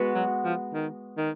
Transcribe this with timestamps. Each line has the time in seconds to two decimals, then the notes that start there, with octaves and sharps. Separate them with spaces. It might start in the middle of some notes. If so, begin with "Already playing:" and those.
Already playing: G#3 B3 F#4 B4
0.15 F#3
0.44 F3
0.74 D#3
1.17 D#3